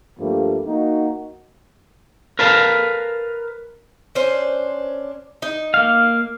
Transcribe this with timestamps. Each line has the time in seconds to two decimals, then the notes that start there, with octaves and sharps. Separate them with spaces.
0.19 G2 F3 G3 A3 A#3
0.66 A#3 D#4 F#4
2.39 A#4 B4 F5 A5
4.15 C#4 D4 C5
5.42 D#4
5.74 A#3 F5